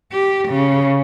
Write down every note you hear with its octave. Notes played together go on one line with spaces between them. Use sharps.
G4
C#3